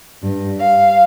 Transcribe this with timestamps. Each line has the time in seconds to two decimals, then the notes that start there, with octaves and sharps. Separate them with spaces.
0.22 G2
0.61 F5